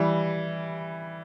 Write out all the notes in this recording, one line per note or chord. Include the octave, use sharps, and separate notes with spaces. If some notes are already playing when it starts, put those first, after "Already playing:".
Already playing: E3 G3